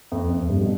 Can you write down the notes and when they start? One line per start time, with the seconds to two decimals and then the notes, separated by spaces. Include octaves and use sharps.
0.12 F2
0.31 F2
0.42 F2
0.50 G2
0.61 B2